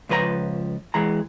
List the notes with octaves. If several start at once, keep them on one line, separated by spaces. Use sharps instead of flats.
C#2 F3 B4 D#5 A#5
E2 E3 G#3 A#5